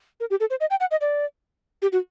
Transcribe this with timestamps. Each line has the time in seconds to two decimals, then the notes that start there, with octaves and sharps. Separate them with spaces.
0.20 A#4
0.30 G4
0.40 A4
0.50 C5
0.60 D#5
0.70 G5
0.80 F#5
0.91 D#5
1.01 D5
1.82 G4
1.92 F#4